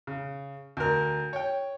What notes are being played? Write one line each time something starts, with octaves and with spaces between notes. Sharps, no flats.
C#3
D2 A#4
C#5 G5